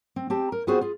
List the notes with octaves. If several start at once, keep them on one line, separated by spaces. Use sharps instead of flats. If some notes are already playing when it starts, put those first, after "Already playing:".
C4
C4 G4 A5
A#4
B3 C4 F4 F#4 G#4 C5
F4 G#4